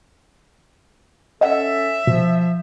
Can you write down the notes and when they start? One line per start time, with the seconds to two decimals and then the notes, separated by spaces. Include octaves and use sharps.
1.41 C#4 A4 D#5 E5 F#5
2.07 B2 F3